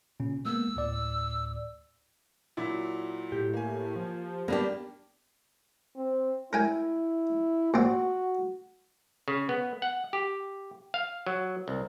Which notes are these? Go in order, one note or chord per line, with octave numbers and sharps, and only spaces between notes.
A#2 C#3 C#4
G#3 A#3 B3 E6
D2 A2 D5
A#2 F#3 E4
A2 G4
A#3 G#5
F3
G3 A#3 B3 D4 G4
C4
E4 A#4 G5 G#5
A#2 C4 F#4
C#3
B3
F#5
G4
F5
F#3
C2